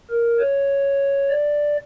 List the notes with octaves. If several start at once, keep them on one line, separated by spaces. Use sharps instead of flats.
A#4
C#5
D5